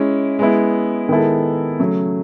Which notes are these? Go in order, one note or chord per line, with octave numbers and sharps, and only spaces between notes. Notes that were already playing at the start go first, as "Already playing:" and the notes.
Already playing: G#3 C#4 E4
G#3 B3 E4
D#3 G#3 B3 E4 A4
C#3 F#3 A3